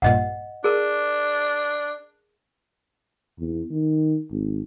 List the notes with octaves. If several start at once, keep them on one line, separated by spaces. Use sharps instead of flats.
A#1 G2 A#2 D#5 F#5
D4 G#4 A#4
E2
D#3
G#1